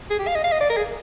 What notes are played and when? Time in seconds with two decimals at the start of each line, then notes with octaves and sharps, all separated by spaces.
0.10 G#4
0.19 G4
0.27 F5
0.35 D#5
0.44 F5
0.52 D#5
0.61 D5
0.70 A#4
0.77 G#4